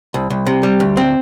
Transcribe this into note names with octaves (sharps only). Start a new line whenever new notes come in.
C2
C2
C3
G3
D2
C4